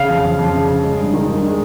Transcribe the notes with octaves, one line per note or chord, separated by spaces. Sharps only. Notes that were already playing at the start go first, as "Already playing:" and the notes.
Already playing: C#3 F5
F2
F2
F2
C#3
C#3
G#3
G2
D#3
G2
G#3